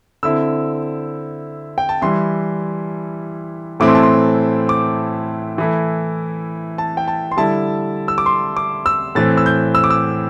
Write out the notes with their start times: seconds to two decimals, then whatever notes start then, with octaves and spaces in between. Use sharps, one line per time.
0.23 D3 C4 E4 E6
1.78 G5
1.89 A5
2.01 E3 G3 E4 C6
3.80 A2 E3 A3 C4 E4 D6
3.88 C6
3.95 A5
4.03 C6
4.69 D6
5.58 E3 A3 E4
6.78 A5
6.97 G5
7.08 A5
7.32 C6
7.37 D3 G3 E4 A5
8.08 E6
8.18 D6
8.26 C6
8.57 D6
8.86 E6
9.15 A2 E3 C4 A6
9.37 E6
9.46 G6
9.75 E6
9.84 D6
9.90 E6